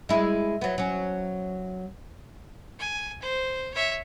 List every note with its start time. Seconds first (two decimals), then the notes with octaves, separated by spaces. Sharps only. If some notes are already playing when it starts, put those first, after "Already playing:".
0.09 G#3 E4
0.61 F#3 B3
0.78 F#3 C#4
2.79 G#5
3.22 C5
3.74 C#5 E5